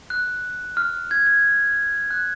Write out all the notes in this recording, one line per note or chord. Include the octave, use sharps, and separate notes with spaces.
F#6
F6
G#6
G#6
F#6